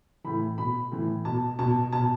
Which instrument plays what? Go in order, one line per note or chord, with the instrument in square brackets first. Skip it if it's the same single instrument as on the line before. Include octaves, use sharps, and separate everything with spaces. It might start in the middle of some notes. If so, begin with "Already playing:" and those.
[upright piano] A2 E3 B5
B2 B5
A2 E3
B2 A5
B2 A5
B2 A5